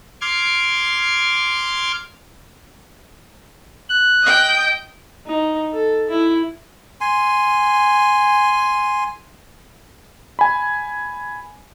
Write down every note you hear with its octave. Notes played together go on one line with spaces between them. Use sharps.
C6 D6 F6 G#6
F#6
D#5 G5
D#4
A4
E4
G#5 C6
G#5 B5